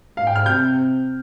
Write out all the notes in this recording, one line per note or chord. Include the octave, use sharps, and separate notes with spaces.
G#2 F5
G5
F6
C3 G6